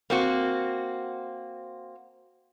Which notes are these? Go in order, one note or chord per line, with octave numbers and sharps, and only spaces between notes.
A#3 C4 F#4